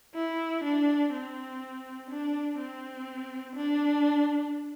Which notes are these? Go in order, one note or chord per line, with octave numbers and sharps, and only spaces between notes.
E4
D4
C4
D4
C4
D4